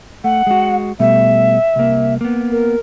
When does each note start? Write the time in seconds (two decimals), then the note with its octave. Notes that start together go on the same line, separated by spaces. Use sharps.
0.24 A3 F#5
0.47 G#3 F#4
1.00 B2 G3 A3 E5
1.76 C2 A#3
2.21 A#3 B3
2.51 A#4